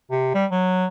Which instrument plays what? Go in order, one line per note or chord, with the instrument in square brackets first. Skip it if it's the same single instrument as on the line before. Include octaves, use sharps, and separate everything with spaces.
[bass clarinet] C3
G3
F#3